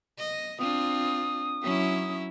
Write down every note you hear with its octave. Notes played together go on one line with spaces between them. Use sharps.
D#5
C4 D4 F4 D#6
F#3 C#4 E4